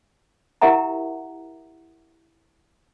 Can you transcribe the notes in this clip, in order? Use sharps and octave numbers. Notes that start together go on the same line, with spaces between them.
E4 G4 A#4 E5 F#5 A#5